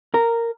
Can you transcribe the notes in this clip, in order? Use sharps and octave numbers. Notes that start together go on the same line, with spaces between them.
A#4